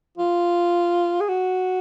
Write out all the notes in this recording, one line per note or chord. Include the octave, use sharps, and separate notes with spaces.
F4
G#4
F#4